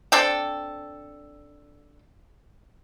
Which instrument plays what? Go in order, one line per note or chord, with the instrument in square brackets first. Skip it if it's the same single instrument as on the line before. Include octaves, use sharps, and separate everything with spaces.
[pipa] C4 D4 A4 G5